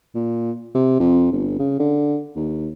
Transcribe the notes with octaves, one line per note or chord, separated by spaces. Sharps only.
A#2
C3
F2
G1
C#3
D3
D#2